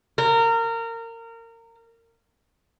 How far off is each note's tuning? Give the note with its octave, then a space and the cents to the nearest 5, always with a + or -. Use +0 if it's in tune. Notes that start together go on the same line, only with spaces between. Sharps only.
A#4 -25